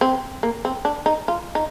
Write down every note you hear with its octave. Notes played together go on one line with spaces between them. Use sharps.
C4
A#3
C4
D4
D#4
F4
D#4